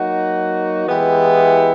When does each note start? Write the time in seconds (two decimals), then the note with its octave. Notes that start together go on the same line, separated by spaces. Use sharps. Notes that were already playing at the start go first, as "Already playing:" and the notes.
Already playing: F#3 A#3 D#4 F#4
0.87 E3 G#3 B3 E4 G4